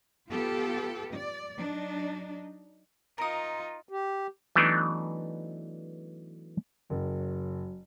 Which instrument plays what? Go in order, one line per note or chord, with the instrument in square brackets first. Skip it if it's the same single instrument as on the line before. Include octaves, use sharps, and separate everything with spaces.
[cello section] B3 F4 G4 A4
D5
F#3 D4 D#4
[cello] D#4 F4 [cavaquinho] A#4 D#6
[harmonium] G4
[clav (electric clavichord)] E3 F#3 A3 B3 D4 D#4
[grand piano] F#1 [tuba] F#3